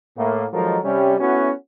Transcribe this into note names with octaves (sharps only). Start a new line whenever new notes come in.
A2 A#3
D#3 F3 F#3 G#3 A4 A#4
C3 G3 C#4
A3 B3 C#4 E4 F#4